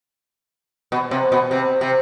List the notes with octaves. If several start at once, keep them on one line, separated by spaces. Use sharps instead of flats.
B2
C3
B2
C3
C3